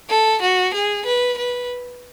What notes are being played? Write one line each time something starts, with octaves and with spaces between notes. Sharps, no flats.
A4
F#4
G#4
B4
B4